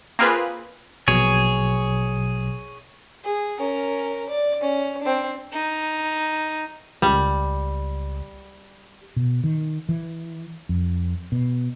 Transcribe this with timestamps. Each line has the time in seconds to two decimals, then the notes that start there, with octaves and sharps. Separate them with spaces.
0.19 A#3 C4 F4 G#4 B4
1.08 A#1 B2 F#3 G#4 C#5
3.24 G#4
3.59 C#4 A#4
4.29 D5
4.61 C#4
5.01 C4 D4
5.53 D#4
7.02 C#2 G3
9.16 B2
9.44 D#3
9.89 E3
10.69 F2
11.32 B2